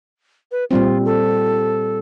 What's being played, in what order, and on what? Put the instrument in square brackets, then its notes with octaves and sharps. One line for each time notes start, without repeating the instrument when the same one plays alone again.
[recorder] B4
[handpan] A#2 G3 C4 [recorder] F4
[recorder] A4